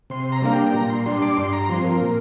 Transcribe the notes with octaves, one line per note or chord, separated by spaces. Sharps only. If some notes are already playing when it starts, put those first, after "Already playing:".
C3 C6
A#5
G3 A#3 D4 F5
G5
A#2 A#5
C6
G3 D4 C6
D6
G2 C6
A#5
F3 C4 C6
A#4
A#2